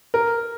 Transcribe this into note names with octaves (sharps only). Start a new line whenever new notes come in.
A#4